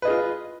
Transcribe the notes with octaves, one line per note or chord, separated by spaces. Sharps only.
F4 G#4 B4 D#5